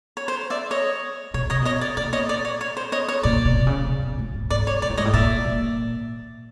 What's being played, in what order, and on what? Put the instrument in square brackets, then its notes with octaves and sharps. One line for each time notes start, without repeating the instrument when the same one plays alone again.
[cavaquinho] C#5
C5
D5 E5
C#5 D#5
[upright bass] B2 [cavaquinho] C#5
[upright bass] C3 [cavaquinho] C#5 D#5
[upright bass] B2 [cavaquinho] C#5 D#5
[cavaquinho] D5
[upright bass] A#2 [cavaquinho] D5
[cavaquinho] C#5 D#5
D5
C#5
C#5
C5
C#5 D#5
C#5
[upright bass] A#2 [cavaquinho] D5
[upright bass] B2
C3
C#3
C3
B2
A2
G#2
[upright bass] G#2 [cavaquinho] D5
[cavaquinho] C#5
[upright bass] A#2 [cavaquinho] D5
[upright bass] A2
[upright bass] G#2 [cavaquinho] C#5 D#5
[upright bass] A2
[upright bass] A#2 [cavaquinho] D5 E5
[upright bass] A#2